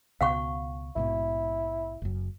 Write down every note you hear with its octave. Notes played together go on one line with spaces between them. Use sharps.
C#2 B2 F5 F#5 C#6
A#1 G#2 B2 E4
F#1 F#2